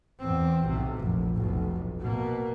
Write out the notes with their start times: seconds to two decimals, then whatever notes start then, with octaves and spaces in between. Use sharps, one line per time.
0.20 E2 C4
0.65 B1 C3
0.97 F1 A#1
1.36 F1 B1
2.00 B2 A#3